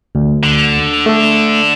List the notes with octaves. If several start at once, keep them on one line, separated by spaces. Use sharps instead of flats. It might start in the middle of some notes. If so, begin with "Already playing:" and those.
D2
D3
A3 A4